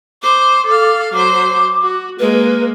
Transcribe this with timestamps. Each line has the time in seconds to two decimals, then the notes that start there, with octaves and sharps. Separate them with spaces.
0.23 C5 D6
0.66 A4 F5
1.13 F#3 C5 D6
1.82 F#4
2.20 G#3 A#3 B4